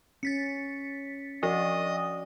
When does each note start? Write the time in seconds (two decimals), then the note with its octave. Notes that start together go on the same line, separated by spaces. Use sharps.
0.23 C#4 A6 B6 C#7
1.43 F3 F#4 D5 D#5 D#6